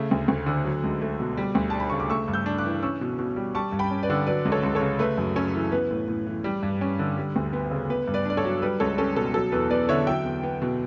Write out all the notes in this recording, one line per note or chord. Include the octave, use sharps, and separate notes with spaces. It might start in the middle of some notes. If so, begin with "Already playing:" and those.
Already playing: C#3 A3
D2
D2
D3
F#3
C#2
A3
B2
G3
D2
D4 A5
B5
C#3 C#6
D6
A3 C#6 E6
G2
E6 G6
D4
D6 F#6
E3
C#4 C#6 E6
B2
B2
G3
G3 A5 C#6
G2
G5 B5
C#4
B4 D5
D3
F#3 B4 D5
C#2
A4 C#5
C#2
A4 C#5
C#3
A3 B4
F#2
C#4 A4 C#5
E3
B3 B4
A2
A2
E3
G3
G2
C#4
D3
G3
D2
B3
C#3
B3 B4
G2
B4 D5
D4 D5
A4 C#5
F#3
G3 B4
C#2 A4 C#5
C#4 A4
B2 A4
F#3 A4
E2 B4
B3 B4 D5
D3 C#5 E5
F#3 E5 G5
E2
B3
B2